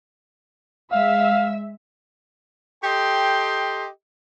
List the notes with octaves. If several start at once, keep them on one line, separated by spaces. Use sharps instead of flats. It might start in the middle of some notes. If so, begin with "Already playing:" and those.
G#3 E5 F5 E6
G4 A4 D#5 G5 C6